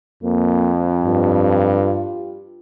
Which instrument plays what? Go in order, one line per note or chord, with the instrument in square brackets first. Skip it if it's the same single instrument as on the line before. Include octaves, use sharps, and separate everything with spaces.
[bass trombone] F2 [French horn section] A#3
[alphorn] G2 [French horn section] F4 G4